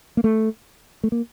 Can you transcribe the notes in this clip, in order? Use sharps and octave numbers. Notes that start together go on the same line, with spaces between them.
A#3
A3
A3
A#3